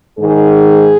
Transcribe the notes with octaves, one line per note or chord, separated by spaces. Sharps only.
G#2 D#3 G#4